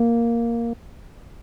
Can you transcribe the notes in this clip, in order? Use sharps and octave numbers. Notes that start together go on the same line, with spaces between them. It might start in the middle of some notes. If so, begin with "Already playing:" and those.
Already playing: A#3